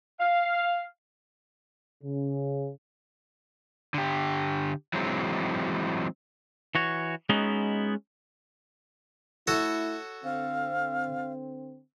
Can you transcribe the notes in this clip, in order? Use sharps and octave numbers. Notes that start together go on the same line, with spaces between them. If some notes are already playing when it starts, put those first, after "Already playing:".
F5
C#3
D3 G4
E3 F#3 G#3 C4
E3 F#4 C#5
G#3 B3 C#4 D#4 E4 F#4
A3 E4 F#4 A4 C#5
D3 C4 F5